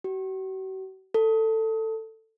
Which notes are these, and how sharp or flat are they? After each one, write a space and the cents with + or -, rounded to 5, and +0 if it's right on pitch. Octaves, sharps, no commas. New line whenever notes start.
F#4 +45
A4 +15